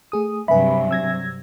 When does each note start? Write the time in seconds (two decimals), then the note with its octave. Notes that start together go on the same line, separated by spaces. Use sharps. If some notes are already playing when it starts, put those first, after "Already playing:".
0.12 A3 G#4 D#6
0.48 G2 C3 F#3 B4 E5 G#5 B5
0.91 E6 G#6 A#6